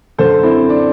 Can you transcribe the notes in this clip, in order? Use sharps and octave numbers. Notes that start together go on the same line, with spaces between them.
F#2 D3 A4 C5
C4 E4
D4